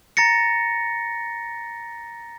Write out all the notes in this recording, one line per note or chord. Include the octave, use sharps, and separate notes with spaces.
A#5 A6 A#6 C#7